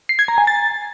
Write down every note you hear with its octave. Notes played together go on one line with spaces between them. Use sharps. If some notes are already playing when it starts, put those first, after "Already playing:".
C7
G#6
A#5
G#5
A6